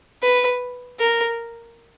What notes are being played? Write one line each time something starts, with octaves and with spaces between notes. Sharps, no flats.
B4
A#4